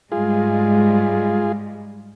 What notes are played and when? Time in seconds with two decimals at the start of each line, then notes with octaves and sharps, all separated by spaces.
0.12 G#2 G3 G#3 F4 G#4